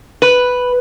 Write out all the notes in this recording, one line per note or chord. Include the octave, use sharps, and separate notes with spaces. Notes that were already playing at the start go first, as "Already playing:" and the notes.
B4